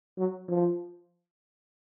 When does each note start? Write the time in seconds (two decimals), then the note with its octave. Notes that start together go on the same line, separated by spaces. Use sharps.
0.18 F#3
0.48 F3